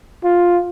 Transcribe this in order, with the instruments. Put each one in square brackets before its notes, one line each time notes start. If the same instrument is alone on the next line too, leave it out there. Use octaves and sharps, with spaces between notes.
[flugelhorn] F4